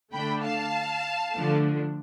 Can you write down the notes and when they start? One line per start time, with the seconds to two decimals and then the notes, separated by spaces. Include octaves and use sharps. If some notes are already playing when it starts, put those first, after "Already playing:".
0.13 D3 A3 D4 G5 B5
0.43 F5 A5
1.35 D3 F3 A3 D4